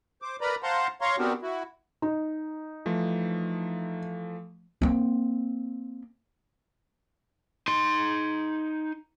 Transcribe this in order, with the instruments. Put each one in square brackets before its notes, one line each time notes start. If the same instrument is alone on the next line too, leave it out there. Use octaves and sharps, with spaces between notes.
[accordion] C5 D6
A#4 B4 D5 A#5 B5
C5 F5 F#5 A5 A#5 C6
C#5 F5 A#5 C6 C#6
B3 C4 D4 F#4 G4 A#4
E4 F#4
[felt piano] D#4
[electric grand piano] E3 F3 A3
[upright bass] A#3 C4
[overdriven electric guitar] D#4 C6